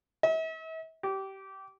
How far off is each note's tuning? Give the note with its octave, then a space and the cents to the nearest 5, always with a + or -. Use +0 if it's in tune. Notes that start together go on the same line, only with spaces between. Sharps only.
E5 -40
G4 -20